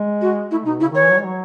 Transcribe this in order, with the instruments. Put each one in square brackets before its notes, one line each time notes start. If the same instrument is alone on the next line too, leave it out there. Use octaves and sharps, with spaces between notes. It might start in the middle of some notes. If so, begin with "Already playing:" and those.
Already playing: [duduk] G#3
[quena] F#4
[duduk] A3 [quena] E4
[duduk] B2 [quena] D#4
[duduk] C#3 [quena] E4
[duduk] D#3
[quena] C#5
[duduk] E3
F#3
G#3
F#3